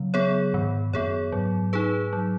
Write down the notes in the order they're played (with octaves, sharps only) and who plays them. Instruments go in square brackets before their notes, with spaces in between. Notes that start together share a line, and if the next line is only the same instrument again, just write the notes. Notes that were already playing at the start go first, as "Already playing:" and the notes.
Already playing: [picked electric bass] C#3 F#3
[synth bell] B3 G#4 C#5
[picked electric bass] G#2 [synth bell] D#3
[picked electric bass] F#2 [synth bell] B3 G#4 C#5
[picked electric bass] G#2 [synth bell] F#3
[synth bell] D#4 G#4 B4
F#3